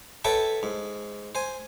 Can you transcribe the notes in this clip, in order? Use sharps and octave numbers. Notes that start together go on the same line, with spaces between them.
A4 B4 C#5 E5 G5 A5
G#2
C5 G#5